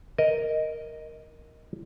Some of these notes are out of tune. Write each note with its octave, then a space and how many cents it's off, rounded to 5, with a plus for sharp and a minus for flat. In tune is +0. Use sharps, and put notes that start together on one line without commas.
A#4 +0 D#5 +0